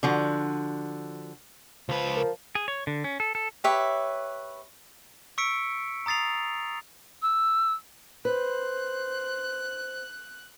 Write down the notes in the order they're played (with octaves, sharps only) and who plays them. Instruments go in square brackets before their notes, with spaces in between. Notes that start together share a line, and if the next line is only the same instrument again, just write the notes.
[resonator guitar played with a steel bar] D3 F3 F#4
[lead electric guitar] C#2 B4 [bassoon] F3
[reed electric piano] A#4
[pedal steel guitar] G#4
C#5
D3
C#4
A4
A4
[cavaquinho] G4 B4 C#5 E5
[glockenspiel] C#6 E6 B6 C#7 D7
A#5 D#6 A6 C7 F7
[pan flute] E6
[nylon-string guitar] B4 [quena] C5 [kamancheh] F#6